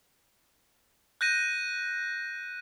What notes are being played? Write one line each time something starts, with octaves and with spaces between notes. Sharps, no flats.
F#6 G6 A#6 D#7